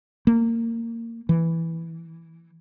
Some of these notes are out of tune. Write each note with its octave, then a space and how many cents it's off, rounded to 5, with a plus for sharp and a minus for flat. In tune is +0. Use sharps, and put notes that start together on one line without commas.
A#3 -20
E3 +0